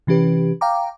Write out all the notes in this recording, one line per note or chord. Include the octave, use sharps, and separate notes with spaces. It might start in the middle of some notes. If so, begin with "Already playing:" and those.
C3 E3 C#4 G4 B4
F5 G5 A#5 D6